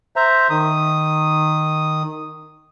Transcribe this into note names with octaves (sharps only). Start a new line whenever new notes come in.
C5 E5 A#5
D#3 D#6